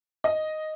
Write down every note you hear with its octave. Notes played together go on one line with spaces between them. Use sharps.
D#5